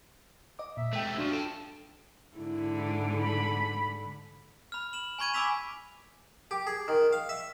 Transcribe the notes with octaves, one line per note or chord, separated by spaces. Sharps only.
D#5 D6
A#2 E5
C3 G#3 A3 G5
F3 D4 F#4
A4 G5 A5
G#2 D3 E4
B5
B5 F6
E7 F#7
G#5 B5 C#6 G#6 D#7
G#5 B5 D6 E6 B6 F7
G4
G#4
D#3
F5
E5